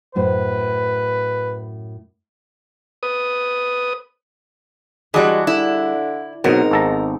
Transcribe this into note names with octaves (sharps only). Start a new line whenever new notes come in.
F#2 A2 B4 C5
B4 D#6
E3 G3 G#3 F#4 G#4 D5 A5 F#6
D3 E4
G#2 B2 F#3 B3 C4 D#4 A#4
G#1 A4 A#5